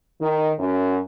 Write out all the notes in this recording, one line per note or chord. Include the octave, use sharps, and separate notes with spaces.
D#3
F#2